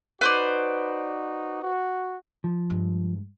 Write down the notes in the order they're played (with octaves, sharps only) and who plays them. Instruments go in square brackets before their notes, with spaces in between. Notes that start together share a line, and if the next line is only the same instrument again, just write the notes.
[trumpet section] D#4 F#4 [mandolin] B4 C5 D5
[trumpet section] F#4
[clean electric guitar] F3
[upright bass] G2 G#3